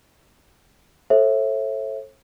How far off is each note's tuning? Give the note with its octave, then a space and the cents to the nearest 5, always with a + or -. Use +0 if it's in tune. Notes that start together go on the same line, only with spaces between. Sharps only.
A4 +0 C#5 -45 E5 +0